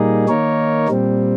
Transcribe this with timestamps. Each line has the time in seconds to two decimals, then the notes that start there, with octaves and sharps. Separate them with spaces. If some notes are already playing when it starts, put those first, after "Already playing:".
Already playing: A#2 G3 A#3 D#4 G#4
0.28 D#3 A#3 D#4 A#4 C#5
0.89 A#2 G3 C4